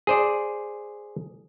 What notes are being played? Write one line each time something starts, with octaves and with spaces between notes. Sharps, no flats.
G#4 C5 D5